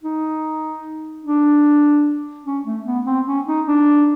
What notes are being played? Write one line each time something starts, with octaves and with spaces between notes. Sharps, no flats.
D#4
D4
C#4
A3
B3
C4
C#4
D#4
D4